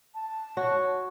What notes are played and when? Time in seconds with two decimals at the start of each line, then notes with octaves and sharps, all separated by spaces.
0.15 A5
0.57 F#4 C#5